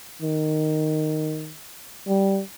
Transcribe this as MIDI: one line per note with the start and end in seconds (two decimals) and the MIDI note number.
0.22 1.53 51
2.08 2.41 55